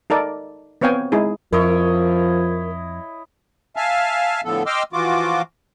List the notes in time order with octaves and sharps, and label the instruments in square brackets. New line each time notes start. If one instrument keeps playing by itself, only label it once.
[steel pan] D#4 A4 A#4 D5
B3 C4 C#5 F5 G5 G#5
G#3 D#4 E4 G#4
[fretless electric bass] F2 [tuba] F3 [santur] E4 C#5 D#5 [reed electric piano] A#4
[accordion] E5 F5 G#5 A5 F6
A2 D3 F3 B3 A4
D#5 G5 C6 D6 E6 F6
E3 F3 F4 F#4 D6